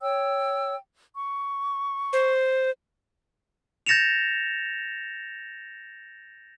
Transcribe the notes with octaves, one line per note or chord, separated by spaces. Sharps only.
C#5 G5 E6
C#6
C5
G6 A6 A#6 C#7 E7 F7